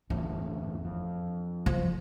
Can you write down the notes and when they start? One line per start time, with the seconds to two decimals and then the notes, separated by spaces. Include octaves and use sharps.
0.10 G1 E2 A2 D4
0.85 F2
1.66 F3